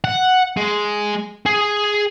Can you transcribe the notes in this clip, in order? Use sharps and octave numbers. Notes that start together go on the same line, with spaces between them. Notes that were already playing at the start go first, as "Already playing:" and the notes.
F#5
G#3
G#4